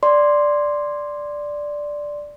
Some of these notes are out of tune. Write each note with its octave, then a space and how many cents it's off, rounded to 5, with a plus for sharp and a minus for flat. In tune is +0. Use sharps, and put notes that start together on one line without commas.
D5 +0 C6 +0